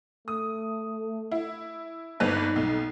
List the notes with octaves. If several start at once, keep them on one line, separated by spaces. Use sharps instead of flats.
A3 D#6
E4
G1 G2 D#4 B4
B1